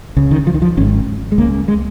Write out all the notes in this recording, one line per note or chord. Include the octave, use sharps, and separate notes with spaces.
C#2 C#3
D#3
F3
D#3
F3
G#1 G#2 C#4
G#3
C#2 C#3 A#3
G#3